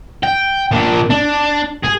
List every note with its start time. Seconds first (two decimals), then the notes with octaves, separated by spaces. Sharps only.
0.23 G5
0.71 A#2 D4
1.10 D4
1.83 G#4